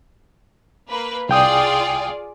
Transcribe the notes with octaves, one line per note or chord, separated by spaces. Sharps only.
A#3 B4
C2 F4 G#4 D5 G5 D#6